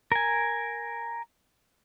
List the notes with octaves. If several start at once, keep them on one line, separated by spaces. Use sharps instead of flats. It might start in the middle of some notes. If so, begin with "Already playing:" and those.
A#4 G#5